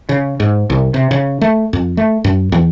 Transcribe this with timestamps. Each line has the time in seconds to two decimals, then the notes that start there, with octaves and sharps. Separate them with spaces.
0.09 C#3
0.40 G#2
0.70 C2
0.94 C3
1.11 C#3
1.41 A3
1.73 F2
1.97 A3
2.24 F#2
2.52 E2